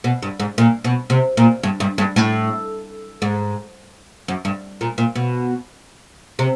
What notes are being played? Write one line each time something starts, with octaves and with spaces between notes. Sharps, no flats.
B2
G2
G#2
A#2
B2
C3
A#2
G2
G2
G2
A2
G#2
F#2
G2
A#2
A#2
B2
C3